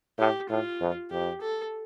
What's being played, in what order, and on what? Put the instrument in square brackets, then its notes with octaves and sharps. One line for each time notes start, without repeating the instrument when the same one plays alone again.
[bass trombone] A2 [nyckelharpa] G4
[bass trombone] A2 [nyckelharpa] F4
[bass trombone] F2
[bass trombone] F2 [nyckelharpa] G4
[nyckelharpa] A4